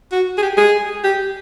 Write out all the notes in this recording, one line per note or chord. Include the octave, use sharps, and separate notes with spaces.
F#4
G#4
G4
G#4
G4